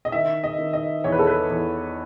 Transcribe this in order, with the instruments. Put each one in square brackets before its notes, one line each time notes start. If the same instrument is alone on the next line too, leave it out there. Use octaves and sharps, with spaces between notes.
[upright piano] D#5
D#3 E5
D#5
D#3
D#5
E2 C#5
B4
A4
B4
E2